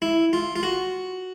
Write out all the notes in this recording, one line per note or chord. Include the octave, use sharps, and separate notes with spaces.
E4
F4
F4
F#4